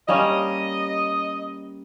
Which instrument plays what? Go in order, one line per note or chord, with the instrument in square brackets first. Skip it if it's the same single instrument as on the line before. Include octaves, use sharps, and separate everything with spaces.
[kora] G3 A#3 C#4 [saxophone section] D#5